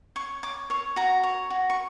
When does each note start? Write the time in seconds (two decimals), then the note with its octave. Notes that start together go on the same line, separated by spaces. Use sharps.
0.16 C#5 C#6
0.43 C#5 D6
0.70 C#5 C#6
0.96 F#4 A#5
1.23 C#5
1.50 F#4
1.70 C#6